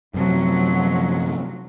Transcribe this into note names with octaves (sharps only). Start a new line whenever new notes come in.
F#2 C3 F3 F#3